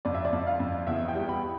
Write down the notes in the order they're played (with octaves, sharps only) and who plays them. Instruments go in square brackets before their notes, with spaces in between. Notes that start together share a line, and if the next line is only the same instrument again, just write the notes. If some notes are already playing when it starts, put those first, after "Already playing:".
[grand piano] F2 D5
E5
D5
F2
F5
F2
E2 E5
G5
G3
B5